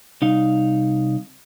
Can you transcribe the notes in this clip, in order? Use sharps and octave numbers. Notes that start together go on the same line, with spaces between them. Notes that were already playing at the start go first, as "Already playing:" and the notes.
C2 D#4 F5